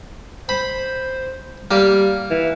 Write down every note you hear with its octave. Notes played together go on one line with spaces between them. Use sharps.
C5 B5
G3 A#3
E3